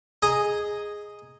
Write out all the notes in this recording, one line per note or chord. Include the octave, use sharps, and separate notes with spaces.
G#4 D#5 G#5 A#5